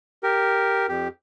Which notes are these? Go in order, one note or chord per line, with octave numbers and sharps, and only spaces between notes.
G4 A#4
F2 G4